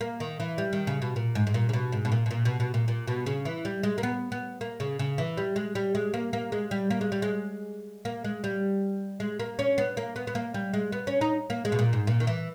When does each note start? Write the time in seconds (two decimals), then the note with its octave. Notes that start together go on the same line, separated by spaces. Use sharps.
0.01 A#3
0.20 D#3
0.40 E3
0.58 G3
0.73 D#3
0.87 C#3
1.02 B2
1.16 A#2
1.35 G#2
1.47 G#2
1.54 A#2
1.69 C#3
1.73 B2
1.92 G#2
2.05 B2
2.12 A#2
2.26 B2
2.31 A#2
2.45 B2
2.60 B2
2.74 A#2
2.88 A#2
3.07 B2
3.26 C#3
3.45 E3
3.65 G3
3.83 G#3
3.98 A#3
4.03 B3
4.32 B3
4.61 A#3
4.80 C#3
4.99 C#3
5.18 E3
5.38 G3
5.56 G#3
5.75 G3
5.95 G#3
6.14 A#3
6.33 A#3
6.52 G#3
6.71 G3
6.90 A#3
7.01 G#3
7.12 G3
7.22 G#3
8.05 A#3
8.24 G#3
8.44 G3
9.20 G#3
9.40 A#3
9.59 C#4
9.78 B3
9.97 A#3
10.16 B3
10.27 B3
10.35 A#3
10.54 G3
10.74 G#3
10.92 B3
11.07 C#4
11.21 D#4
11.50 A#3
11.65 G#3
11.72 B2
11.79 A#2
11.93 G#2
12.07 A#2
12.20 D#3
12.27 E3